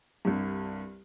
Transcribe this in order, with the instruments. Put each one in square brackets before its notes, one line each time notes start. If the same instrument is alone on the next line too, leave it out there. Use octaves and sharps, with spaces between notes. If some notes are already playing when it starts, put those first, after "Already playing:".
[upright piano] C2 G2